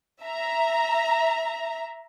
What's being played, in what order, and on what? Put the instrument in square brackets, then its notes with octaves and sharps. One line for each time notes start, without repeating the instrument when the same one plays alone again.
[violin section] E5 A#5